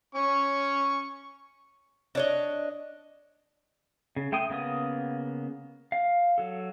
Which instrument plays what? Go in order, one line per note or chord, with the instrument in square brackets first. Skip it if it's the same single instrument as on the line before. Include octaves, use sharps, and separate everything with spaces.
[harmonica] C#4 C#6
[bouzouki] D4 C#5 D#5
[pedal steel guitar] C#3
A3 G5 C6 D#6
C#3 A#3 B3 D#6
F5
F#3 A4